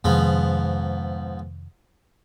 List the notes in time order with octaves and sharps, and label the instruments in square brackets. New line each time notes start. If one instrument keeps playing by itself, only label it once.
[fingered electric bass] F2 C3 D#3 [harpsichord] G#2 F3 B3